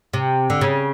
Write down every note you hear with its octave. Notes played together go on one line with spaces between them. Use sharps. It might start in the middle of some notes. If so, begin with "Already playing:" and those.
C3
D3
C#3